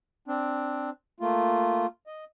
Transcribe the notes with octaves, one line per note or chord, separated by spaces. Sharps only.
C4 D4
A3 A#3 F4
D#5